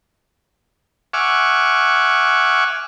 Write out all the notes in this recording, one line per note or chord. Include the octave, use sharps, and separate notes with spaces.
E5 F#5 G#5 C#6 D6 F6